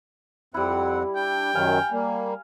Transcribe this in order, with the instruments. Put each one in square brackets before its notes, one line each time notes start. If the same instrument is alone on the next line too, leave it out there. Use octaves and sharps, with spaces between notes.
[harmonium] F2 C4 F#5 [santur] G3 E4
[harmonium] D4 [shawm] G5
[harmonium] F#2 D#3 F#3 [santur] F5 G#5
[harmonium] G3 A#3